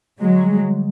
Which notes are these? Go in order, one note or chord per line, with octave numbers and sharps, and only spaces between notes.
D3 F#3 G#3
G3
D3